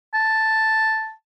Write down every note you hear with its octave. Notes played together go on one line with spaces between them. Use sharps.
A5